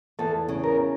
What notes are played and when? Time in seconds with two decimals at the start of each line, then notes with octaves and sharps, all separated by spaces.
0.19 E2 A4
0.49 C#3
0.64 A#4